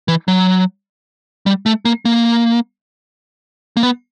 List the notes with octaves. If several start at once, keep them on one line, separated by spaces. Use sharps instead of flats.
E3
F#3
G3
A3
A#3
A#3
A#3
B3